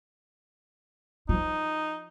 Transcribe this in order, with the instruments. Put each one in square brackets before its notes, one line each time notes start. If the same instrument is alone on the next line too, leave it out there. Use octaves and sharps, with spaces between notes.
[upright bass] F3 F4 [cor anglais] D#4